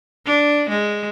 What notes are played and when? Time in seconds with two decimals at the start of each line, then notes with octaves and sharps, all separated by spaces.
0.26 D4
0.69 G#3